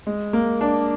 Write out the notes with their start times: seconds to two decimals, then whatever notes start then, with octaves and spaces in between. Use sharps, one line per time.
0.07 G#3
0.33 A#3
0.61 D4